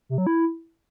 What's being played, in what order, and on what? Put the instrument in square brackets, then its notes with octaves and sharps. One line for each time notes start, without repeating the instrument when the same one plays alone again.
[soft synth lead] C3
F#3
E4